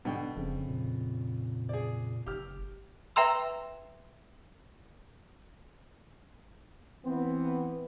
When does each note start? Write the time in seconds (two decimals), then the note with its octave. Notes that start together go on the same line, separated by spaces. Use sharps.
0.05 G#2 B2 D3 G3 G5
0.36 E1 F2 C#3 C4
0.68 A#2
1.69 G#4 D5
2.26 F#1 G4 F6
3.16 B4 E5 G5 A#5 C6 E6
7.05 E3 B3 C4